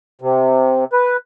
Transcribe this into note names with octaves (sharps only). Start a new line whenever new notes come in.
C3
B4